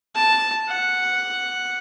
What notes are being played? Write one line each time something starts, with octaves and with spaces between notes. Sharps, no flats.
A5
F#5